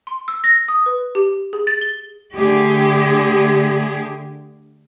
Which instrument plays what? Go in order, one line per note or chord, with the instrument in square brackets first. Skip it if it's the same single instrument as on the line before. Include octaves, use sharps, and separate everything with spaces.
[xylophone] C6
E6
A#6
D#6
B4
G4
G#4
A6
G7
[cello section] D3 A3 G4 G#4